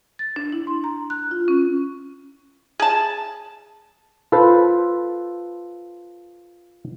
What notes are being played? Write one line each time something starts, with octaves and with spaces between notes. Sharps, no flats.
A6
D4
E4
C6
A#5
F#6
F4
C#4
G#4 A5
F4 A4 B4 C5